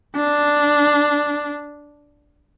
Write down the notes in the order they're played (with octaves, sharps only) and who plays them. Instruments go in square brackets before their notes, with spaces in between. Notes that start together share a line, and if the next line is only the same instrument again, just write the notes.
[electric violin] D4